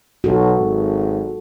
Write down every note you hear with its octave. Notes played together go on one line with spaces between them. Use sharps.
B1 F#4 A4
G#1